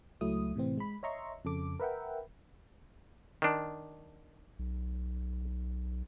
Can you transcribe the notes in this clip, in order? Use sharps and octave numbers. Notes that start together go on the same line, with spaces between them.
C#2 F#3 A3 E4 D#6
A2 C3 E3 C4
G#3 B5
C#5 D#5 E5 A#5 C6 C#6
F2 C#3 A4 D6
A#4 B4 E5 F#5 G5
D#3 D4
B1